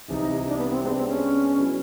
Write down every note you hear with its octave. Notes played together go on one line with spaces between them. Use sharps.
C2 C3 E3 G3 D#4
D4
B3
C4
G#3 B3 C4 D4
C4
C#4
F#3 B3 E4